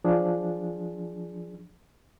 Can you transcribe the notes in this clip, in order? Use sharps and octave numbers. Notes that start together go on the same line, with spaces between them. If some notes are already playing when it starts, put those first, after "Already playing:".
F3 D4 G#4